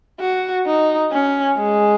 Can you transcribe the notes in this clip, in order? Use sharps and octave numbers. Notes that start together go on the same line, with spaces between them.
F#4
D#4
C#4
G#3